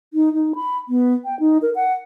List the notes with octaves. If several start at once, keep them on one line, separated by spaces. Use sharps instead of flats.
D#4
D#4
B5
B3
G5
D#4
A#4
F#5